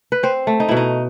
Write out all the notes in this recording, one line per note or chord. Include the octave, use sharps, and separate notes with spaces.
B4
C4 C5
A3
D#4
B2 E4
D#4